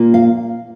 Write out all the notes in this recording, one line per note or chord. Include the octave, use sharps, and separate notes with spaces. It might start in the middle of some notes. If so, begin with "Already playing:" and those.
Already playing: A#2 A#3 F4
F5